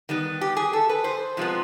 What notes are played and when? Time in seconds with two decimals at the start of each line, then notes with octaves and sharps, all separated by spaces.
0.09 D#3 G3 B3
0.41 G4
0.57 G#4
0.73 A4
0.89 B4
1.04 C5
1.37 C3 F3 G#3 B3